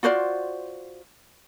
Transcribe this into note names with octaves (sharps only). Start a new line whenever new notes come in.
F4 F#4 C5 D5